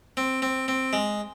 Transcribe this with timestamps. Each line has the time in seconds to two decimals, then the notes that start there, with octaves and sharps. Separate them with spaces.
0.17 C4
0.42 C4
0.68 C4
0.93 G#3